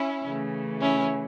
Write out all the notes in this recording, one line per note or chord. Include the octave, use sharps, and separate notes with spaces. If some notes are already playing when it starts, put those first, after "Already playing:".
Already playing: C#4 E4
C#3 E3 A3
C#4 E4